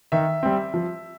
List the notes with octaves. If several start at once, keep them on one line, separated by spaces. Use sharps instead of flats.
D#3 E5
G3 C4
F3